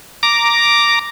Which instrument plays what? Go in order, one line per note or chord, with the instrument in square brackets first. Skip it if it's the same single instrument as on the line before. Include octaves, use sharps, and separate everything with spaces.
[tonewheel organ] A#5 D6